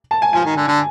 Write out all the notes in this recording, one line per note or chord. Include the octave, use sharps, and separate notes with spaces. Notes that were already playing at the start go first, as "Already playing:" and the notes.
A5
G#5
F3 G#5
D#3
D3
D3